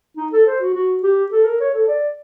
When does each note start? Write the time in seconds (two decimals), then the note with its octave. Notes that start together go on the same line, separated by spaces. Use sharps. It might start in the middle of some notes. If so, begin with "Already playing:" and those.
0.17 D#4
0.33 A4
0.47 C5
0.61 F#4
0.74 F#4
1.03 G4
1.32 A4
1.45 A#4
1.60 C#5
1.74 A4
1.88 D5